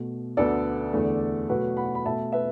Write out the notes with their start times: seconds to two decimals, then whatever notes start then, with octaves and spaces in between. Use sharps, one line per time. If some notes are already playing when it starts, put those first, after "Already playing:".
Already playing: B2 A3
0.37 D2 D3 B3 A4 D5
0.93 E2 D3 A3
1.49 B2 F#3 A3 F#4 B4
1.77 F#5 B5
1.95 B5
2.05 B2 A3 E5 A5
2.32 B4 E5